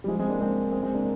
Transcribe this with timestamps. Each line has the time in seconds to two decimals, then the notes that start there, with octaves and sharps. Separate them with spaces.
0.04 G3
0.08 F3 G#3
0.19 G#3 C4
0.29 A#3 D4
0.40 G#3 C4
0.72 G#3 C4
0.83 G#3 C4
0.95 A#3 D4